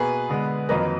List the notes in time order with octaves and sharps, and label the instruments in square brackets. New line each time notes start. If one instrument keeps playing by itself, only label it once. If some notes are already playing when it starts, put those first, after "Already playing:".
Already playing: [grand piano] B2 A#3 G#4 B4
D3 G#3 B3
F2 D#3 F#3 A#3 B4 D#5